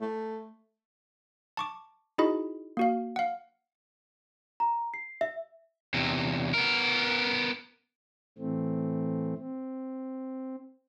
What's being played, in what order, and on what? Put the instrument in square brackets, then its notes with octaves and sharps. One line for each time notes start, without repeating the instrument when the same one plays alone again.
[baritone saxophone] A3
[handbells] A5 C#6 D6
D#4 E4 F#4 G#4 D#5 B5
A#3 F#4 F5
F5 F#5
[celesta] A#5
C7
E5
[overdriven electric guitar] E2 C3
B3 A#4
[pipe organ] A2 E3 A3 C4
C4